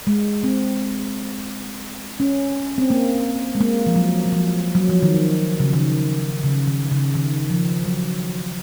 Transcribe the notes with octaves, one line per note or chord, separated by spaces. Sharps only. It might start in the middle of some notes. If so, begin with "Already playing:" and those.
G#3
C4
C#4
C4
A#3
G#3
A#3
F3
F#3
F#3
F3
F#3
F3
D#3
C#3
D#3
C#3
D#3
C#3
D#3
F3
F#3